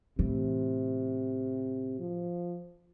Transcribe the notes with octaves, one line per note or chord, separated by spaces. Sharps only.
A2 C3 E3
F3